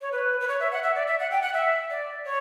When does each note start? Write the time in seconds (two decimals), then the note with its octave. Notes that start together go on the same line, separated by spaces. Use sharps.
0.01 C#5
0.12 B4
0.40 B4
0.48 C#5
0.60 E5
0.71 F#5
0.83 E5
0.95 D5
1.07 E5
1.19 F#5
1.31 G5
1.42 F#5
1.54 E5
1.90 D5
2.25 C#5